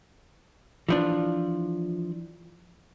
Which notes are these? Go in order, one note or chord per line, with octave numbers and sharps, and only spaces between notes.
E3 F3 D4